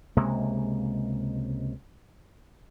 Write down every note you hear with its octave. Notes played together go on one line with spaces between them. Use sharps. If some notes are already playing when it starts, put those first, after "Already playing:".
C#2 C3 G#3 A#3